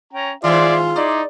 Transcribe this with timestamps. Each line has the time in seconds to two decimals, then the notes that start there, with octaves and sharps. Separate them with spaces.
0.13 C#4 G5 A#5
0.44 G#2 D#3 F4 G#4 C5 D5 E5
0.96 D#4 E4 D5 C6 D6